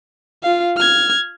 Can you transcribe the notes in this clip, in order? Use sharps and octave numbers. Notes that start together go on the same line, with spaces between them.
F4 F5
F6 G#6